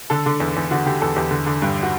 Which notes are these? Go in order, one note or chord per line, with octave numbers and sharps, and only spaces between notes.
D3 A4
D3
E2
E2
D3 F#4
D3 G4
E2 A4
E2 G4
D3
D3
G2
F#4